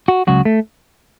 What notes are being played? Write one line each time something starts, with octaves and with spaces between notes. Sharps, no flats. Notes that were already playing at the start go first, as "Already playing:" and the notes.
F#4
C#2 C#3 F#3 F#4
A3